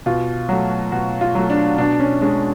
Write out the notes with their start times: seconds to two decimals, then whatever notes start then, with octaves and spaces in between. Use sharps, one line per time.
0.06 B2 F4
0.49 F#3 A3 F#4
0.92 B2 F#4
1.21 F4
1.35 F#3 A3
1.50 D4
1.78 B2 D4
2.00 C#4
2.21 G#3 C#4 D4